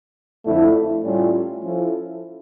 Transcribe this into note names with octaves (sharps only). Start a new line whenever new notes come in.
F2 D3 A3 E4
A2 G3 C#4 F4 A4
F3 C#4 E4 A4